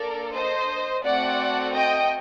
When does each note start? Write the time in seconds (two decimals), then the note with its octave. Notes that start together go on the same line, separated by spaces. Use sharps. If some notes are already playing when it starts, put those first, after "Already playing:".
Already playing: A#3 D4 A4 A#4 D5
0.32 C5 D#5
1.03 A3 C4 F#4 A4 D5 F#5
1.75 D#5 G5